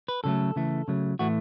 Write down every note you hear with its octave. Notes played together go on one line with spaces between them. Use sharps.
B4
C#3 F#3 A3 A4
C#3 E3 A3
C#3 F#3 A3
A2 E3 A3 F#4